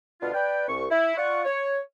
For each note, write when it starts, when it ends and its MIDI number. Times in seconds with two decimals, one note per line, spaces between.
0.21 0.30 38
0.21 0.30 47
0.21 0.30 59
0.21 0.30 62
0.21 0.30 65
0.34 0.67 71
0.34 0.67 74
0.34 0.67 79
0.68 0.85 36
0.68 0.85 85
0.90 1.17 64
1.17 1.43 65
1.17 1.43 74
1.17 1.43 78
1.17 1.43 85
1.45 1.78 73